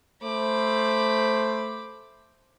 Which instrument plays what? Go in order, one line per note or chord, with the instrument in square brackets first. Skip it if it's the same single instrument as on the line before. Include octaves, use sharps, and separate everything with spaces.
[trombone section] A3 C5 [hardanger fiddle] B5 D6